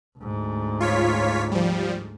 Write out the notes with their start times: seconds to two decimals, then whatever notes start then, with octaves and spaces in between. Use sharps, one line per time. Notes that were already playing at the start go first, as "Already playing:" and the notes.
0.18 D2 G#2
0.80 F4 C#5 B6
1.52 F3 G3